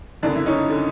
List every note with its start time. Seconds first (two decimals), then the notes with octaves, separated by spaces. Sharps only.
0.23 F#1 F2 D3 D4
0.35 E4
0.46 C#4 D#4
0.70 D3